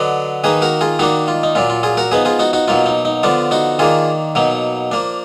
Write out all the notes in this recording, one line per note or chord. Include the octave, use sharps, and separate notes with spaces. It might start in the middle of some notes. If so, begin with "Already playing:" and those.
Already playing: D3 F#3 D4 B4 D#5
D#3 A#3 D#4 G#4 B4
F#4 A#4
F4 G#4
D#3 A#3 D4 D#4 F#4
F4
D#4
A#2 F#3 D4 F4
F4
F4 G#4
F#4 A#4
F3 B3 D#4 G#4 B4
F4 G#4
D#4 F#4
D#4 F#4
B2 F#3 A#3 D#4 F4
D#4
D#4
D3 F3 B3 D4 F4
D#4 F#4
D#3 A#3 D4 F4 G#4
B2 F#3 A#3 D#4
F3 A#3 D4